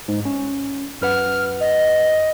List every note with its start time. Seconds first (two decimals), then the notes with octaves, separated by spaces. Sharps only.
0.08 G#2
0.25 C#4
1.01 F#2 B4 F#5 F6
1.60 D#5